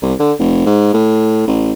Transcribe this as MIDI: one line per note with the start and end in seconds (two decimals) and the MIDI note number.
0.02 0.14 36
0.19 0.33 50
0.39 0.65 29
0.66 0.93 44
0.94 1.44 45
1.47 1.72 33